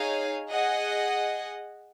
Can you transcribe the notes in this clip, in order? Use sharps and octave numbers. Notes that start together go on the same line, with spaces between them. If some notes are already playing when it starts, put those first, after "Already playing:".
Already playing: D#4 G#4 C#5 F5 G#5
G#4 D#5 F#5